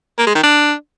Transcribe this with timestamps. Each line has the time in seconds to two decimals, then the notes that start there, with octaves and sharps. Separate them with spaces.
0.18 A#3
0.27 G#3
0.35 D#3
0.43 D4